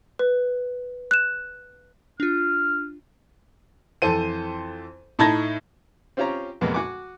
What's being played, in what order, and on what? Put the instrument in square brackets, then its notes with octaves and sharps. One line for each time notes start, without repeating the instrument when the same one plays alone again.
[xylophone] B4
F#6 E7
[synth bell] D4 F4 [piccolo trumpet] F6
[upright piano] F2 E3 A4 C5 D#7
A2 D#4 A5 B5 G#6 A#6
[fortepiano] C4 C#4 F4 G4 C#5 A#5
F2 C3 G#3 A#3 B3
F#4 F#5 G#5 D6